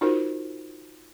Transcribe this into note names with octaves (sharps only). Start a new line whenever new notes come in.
D#4 F4 F#4 A#4 C5